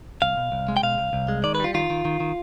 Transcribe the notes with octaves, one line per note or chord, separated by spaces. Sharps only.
C2 F5
B2
C2
G#3
G5
B2 F5
C2
C2
G#3
D#3 D5
B4
G3 F4
D#3 F4
D#3
D#3
D#3